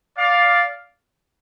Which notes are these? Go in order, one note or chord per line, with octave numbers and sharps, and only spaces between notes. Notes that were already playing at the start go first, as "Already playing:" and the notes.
D5 F5